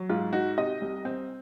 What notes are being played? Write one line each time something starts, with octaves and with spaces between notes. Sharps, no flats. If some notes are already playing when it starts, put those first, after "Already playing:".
Already playing: F#3
G#2 F4
D#4 F#4
C3 D#5
C2
C4